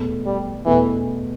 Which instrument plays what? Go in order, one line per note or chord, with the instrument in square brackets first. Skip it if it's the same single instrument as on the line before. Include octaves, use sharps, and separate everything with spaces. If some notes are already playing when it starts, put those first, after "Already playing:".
Already playing: [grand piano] E2 B2 A3
[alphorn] G3
[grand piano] E2 B2 A3 [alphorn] E3